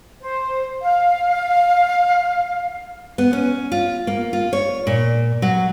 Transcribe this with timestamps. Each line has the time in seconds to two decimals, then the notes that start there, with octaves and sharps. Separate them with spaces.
0.21 C5
0.82 F5
3.18 B3
3.33 C#4
3.72 F4
4.07 A#3
4.33 F4
4.53 C#5
4.87 A#2
5.42 F#3